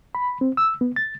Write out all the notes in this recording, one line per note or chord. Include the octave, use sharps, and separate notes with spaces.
B5
C4
E6
B3
A6